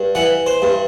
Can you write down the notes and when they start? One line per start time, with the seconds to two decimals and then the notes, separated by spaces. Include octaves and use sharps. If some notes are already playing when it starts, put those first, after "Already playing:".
Already playing: G2
0.15 E3 F#5
0.46 C5
0.62 G2